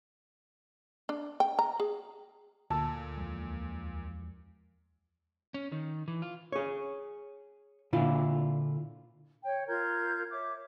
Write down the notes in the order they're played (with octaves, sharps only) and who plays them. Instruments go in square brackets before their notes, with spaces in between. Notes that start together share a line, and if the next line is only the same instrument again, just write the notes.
[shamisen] D4
G5
A#5
G#4
[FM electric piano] D2 [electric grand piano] A#2 [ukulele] A4 A5
[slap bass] E2 F3 G#3
[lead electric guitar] C#4
D#3
E3
F4
[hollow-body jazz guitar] G#4 C#5
A#2 D3 E4 F4
[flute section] C#5 G5
F4 A#4 G6 G#6
C#5 E5 D6